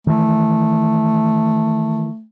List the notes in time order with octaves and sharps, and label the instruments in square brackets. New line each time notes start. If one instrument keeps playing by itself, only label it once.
[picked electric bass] D#3 E3 [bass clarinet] A3